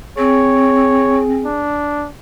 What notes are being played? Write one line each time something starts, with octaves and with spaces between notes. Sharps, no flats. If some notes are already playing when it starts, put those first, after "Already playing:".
C4 G#4 C#5
D4